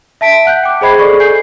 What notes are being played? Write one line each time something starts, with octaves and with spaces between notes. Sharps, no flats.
E5 A5 B6 D7
F#5 F#6 G6
G5 D6
G#4 C5 D#5 B5 G#6 C7
G#4 A4 D5 C#6
A4 G#5 G6 C7